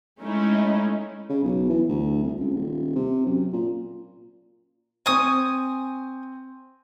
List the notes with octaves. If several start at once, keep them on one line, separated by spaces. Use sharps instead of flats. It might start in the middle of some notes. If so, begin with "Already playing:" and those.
G#3 A3 C#4 D#4 E4
C#3
B1
E3
D2
C2
C#2
D#1
C3
F#2
A#2
C4 G#5 C#6 D#6